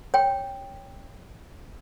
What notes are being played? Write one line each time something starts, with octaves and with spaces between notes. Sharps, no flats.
C#5 G5